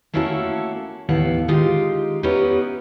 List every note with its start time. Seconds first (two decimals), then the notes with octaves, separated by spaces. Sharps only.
0.14 A3 A#3 C#4 E4 F#4 A4
1.09 D#2 A2 E3 B3 F5 F#5
1.48 D#3 G#3 D#4 F4 G4
2.23 B3 C#4 D#4 E4 G4 B4